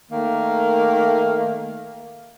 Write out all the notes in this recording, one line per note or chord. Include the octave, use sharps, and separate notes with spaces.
D#3 A3 A#3